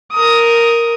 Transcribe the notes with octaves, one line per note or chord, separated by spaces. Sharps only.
A#4 D#6